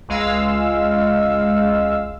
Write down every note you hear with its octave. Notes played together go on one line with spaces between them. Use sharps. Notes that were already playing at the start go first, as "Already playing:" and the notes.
C#2 G#3 F5 E6